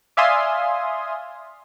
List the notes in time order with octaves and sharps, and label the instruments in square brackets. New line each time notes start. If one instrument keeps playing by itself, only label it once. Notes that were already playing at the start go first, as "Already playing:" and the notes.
[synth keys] D5 E5 F5 G#5 C6 D#6